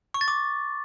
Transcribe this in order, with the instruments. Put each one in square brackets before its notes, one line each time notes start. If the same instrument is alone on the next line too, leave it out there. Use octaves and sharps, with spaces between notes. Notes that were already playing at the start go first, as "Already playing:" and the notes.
[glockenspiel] C#6
A6
D6